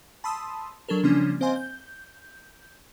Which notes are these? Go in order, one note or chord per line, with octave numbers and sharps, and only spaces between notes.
A5 B5 C6 D#6 E6
F#3 D4 A4 A#4
C#3 F3 G3 A#3 C#4 D4
C4 C5 D#5 F5 G#5 C6
G6